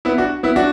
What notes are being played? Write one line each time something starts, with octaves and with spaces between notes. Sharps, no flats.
B3 E4
D4 F#4
B3 E4
D4 F#4